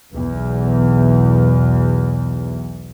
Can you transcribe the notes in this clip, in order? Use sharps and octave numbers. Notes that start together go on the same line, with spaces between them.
B1 E2